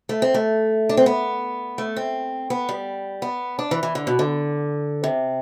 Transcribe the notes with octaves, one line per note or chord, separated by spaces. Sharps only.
A3
C4
A3
D4
C4
B3
A3
C4
B3
G3
B3
D4
E3
E3
D3
B2
D3
C3